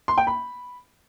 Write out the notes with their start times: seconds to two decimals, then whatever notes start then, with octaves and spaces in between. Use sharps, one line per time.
0.08 C6
0.18 G5
0.27 B5